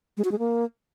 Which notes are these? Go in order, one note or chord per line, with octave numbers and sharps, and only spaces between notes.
G#3
F#4
G#3
A#3